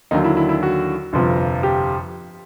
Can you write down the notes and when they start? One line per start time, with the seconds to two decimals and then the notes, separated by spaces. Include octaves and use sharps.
0.11 D#2 D3 F#3 D#4
0.24 E4
0.37 E4
0.49 E4
0.63 F#4
1.13 G1 F2 C3 F3
1.63 G4